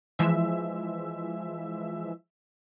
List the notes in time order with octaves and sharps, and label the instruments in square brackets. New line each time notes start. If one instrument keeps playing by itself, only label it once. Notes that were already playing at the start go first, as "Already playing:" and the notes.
[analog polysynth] E3 F3 G#3 E5